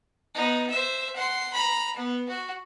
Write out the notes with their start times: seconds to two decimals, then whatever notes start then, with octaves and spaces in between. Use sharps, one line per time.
0.35 B3 D#4
0.70 C5 E5
1.15 F#5 C6
1.53 A#5 B5
1.96 B3
2.29 F#4